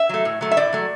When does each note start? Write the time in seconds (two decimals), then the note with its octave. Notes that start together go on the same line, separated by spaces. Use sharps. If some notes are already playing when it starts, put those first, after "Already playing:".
Already playing: E5
0.09 F#3 A3
0.25 A2
0.41 F#3 A3
0.51 E5
0.57 A2 D5
0.73 F#3 A3